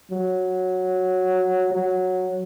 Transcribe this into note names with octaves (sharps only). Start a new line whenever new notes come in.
F#3
F#3